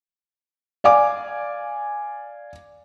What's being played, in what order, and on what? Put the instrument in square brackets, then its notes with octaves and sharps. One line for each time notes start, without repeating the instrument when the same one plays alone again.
[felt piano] D5 F5 G#5 D6